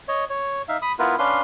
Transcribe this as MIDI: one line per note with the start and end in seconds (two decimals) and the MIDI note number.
0.08 0.24 73
0.08 0.24 75
0.30 0.62 73
0.68 0.77 63
0.68 0.77 76
0.68 0.77 77
0.82 0.92 83
0.82 0.92 87
0.99 1.16 59
0.99 1.16 64
0.99 1.16 65
0.99 1.16 70
0.99 1.16 71
1.19 1.42 61
1.19 1.42 62
1.19 1.42 71
1.19 1.42 77
1.19 1.42 84